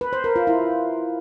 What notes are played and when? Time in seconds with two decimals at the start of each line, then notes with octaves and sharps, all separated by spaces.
0.01 B4
0.13 C5
0.24 A#4
0.36 F4
0.47 E4